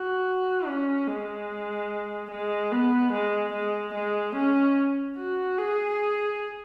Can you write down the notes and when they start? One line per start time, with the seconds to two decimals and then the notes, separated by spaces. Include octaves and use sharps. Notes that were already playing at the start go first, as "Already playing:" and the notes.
Already playing: F#4
0.67 C#4
1.08 G#3
2.31 G#3
2.72 B3
3.13 G#3
3.53 G#3
3.94 G#3
4.36 C#4
5.18 F#4
5.58 G#4